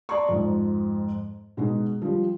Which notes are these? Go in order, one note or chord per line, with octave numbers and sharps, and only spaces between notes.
D5 A5 A#5 C6 C#6
F2 G#2
B2 G#3 D#4 F#4 G#4
F3 G3